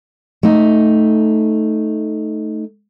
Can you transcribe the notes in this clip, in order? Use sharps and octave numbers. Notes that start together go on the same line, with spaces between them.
A3 D#4